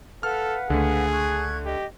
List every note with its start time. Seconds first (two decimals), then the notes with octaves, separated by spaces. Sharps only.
0.23 A4 B4 F5 F#5 F6
0.70 C#2 D3 A3 G#4
1.12 C#6 F#6 G#6
1.65 G4 D#5